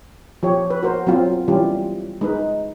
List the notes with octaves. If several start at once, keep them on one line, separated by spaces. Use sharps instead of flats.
F3 G4 C#5
B4
F#4 A#4 C5
F#3 C4 F4
E3 G3 C#4 F4 G4
G#3 D#4 B4